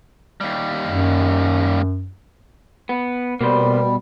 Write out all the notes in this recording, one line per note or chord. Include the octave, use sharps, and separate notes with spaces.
D#2 G3
F#2
B3
B2 G3 A#3 B4 C5